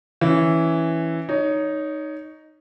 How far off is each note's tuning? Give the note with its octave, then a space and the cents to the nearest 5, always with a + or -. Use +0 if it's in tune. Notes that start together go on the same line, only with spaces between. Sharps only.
E3 +0 C#4 +0
D#4 -5 C#5 +15